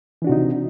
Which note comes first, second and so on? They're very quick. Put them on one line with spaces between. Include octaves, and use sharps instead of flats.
E3 D4 F#4 C3 D#4